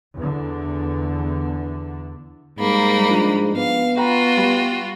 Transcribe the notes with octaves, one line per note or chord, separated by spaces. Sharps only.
E2 D3
G#2 G3 A#3 B5
F3 D4 D#7
B3 F5
F4 F#4 G5 A#5 B5
G3